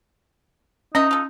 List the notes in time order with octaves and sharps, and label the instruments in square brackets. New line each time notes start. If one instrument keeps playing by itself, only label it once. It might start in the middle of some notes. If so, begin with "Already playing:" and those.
[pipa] B3 D#5 E5 [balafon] C#4 [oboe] D#4
[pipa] F4 A4